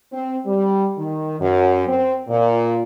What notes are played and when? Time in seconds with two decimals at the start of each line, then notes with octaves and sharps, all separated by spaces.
0.13 C4
0.45 G3
0.97 D#3
1.40 F#2
1.87 C4
2.29 A#2